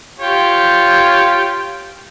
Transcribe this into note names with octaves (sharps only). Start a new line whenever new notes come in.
F4 G4 C#5